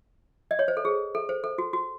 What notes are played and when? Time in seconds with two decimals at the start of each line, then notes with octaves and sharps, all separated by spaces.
0.51 D#5
0.59 C#5
0.68 C5
0.77 A4
0.85 G#4
1.15 A4
1.29 C5
1.44 A4
1.58 F#4
1.73 F#4